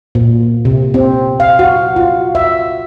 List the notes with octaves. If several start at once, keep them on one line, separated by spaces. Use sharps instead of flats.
A#2
C3
C4
F5
F#4
F4
E5